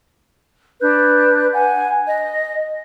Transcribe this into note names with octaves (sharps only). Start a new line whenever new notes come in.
D4 B4 F#6 G6
F#5 G#5
D#5